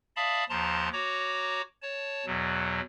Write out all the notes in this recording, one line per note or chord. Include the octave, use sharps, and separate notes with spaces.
D5 E5 F5 A5 B5 D#6
D#2 F3 A5 A#5 C6
F#4 C#5 A#5 D6
C#5 A5
E2 B2 F#3